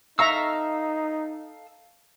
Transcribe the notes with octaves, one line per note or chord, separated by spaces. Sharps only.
D#4 A4 E5 F5 A#5 C#6 E6